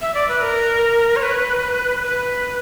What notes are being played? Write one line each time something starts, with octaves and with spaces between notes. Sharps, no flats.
E5
D5
B4
A#4
C#5
B4
B4